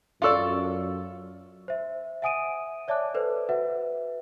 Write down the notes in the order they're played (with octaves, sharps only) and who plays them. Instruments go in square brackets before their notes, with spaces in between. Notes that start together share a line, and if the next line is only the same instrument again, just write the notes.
[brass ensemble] F#2 [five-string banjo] F4 A4 D5 [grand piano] F5 C#6 E6
[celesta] C5 E5
E5 F#5 G#5 D#6 D7 D#7
C#5 D5 E5 A5 D6 F#6
A4 B4 C5 D5
F#4 B4 E5 F#5